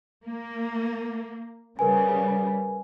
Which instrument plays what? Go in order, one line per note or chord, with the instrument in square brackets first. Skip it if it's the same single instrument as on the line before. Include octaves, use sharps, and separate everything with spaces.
[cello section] A#3
[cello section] C#3 G3 [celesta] A#4 B4 G#5